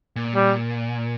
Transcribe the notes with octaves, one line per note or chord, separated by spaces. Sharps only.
A#2
G3